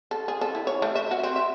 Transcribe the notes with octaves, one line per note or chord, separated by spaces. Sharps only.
A4
G#4
A4
E4
C#5
A3
E5
F#4
C4
E5